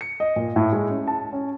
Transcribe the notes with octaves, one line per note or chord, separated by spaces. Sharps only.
C#7
D#5
A#2
A2
G#3
C#4
A5
C#4